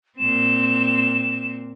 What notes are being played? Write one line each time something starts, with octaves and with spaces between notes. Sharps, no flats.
A#2 C4 E7